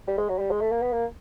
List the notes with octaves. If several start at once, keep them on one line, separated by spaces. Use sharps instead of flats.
G3
G#3
F#3
G3
G#3
A3
A#3
B3
A#3